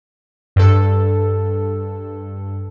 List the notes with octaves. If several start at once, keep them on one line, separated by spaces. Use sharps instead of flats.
G2 A4